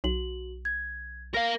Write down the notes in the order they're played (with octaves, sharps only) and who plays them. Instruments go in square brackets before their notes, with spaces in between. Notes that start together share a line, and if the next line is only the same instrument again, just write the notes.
[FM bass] B1 [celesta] F#4 F#7
[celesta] G#6
[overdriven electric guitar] A#4 F5 [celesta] A#6